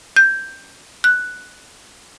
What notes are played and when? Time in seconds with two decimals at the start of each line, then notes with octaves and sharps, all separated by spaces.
0.16 G6
1.04 F#6